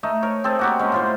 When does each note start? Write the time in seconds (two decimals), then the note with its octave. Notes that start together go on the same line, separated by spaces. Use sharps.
0.03 A3 D#4
0.22 A#4 C#5
0.44 C4 G#4 A4
0.59 A#3 F#4 G4
0.79 G#3 C#4
0.92 A2 F4 C5